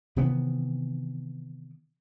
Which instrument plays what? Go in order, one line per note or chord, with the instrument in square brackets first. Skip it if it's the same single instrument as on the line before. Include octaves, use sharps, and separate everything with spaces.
[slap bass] C3 D#3 E3 B3